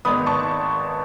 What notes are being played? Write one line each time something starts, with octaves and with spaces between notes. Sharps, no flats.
G#1 G#2 D#3 G#3 B3 B5 D#6
A5 C#6